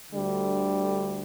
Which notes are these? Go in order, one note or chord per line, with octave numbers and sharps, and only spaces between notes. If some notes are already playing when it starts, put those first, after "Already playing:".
D2 D3 G3